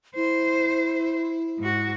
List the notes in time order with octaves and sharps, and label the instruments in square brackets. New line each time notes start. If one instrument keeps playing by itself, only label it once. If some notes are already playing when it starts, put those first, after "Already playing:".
[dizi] E4 [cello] C5
[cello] G#2 F#4